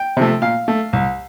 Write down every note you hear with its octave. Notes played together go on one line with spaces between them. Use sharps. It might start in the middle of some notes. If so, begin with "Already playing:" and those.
Already playing: G5
C3 F3 A3
A#2 F5
A3
C2